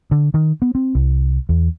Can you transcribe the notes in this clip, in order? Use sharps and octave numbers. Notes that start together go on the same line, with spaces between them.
D3
D#3
B3
C4
C2
E2